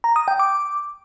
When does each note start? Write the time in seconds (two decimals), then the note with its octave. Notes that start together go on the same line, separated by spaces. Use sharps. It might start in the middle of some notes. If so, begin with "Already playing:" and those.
0.04 A#5
0.16 D#6
0.28 G5
0.39 D6